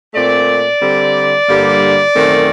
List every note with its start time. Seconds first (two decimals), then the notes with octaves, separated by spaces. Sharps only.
0.14 A#2 A3 C4 D5
0.81 D3 G3 C4
1.48 G2 D3 G3 A#3
2.14 F#2 D#3 A3 C4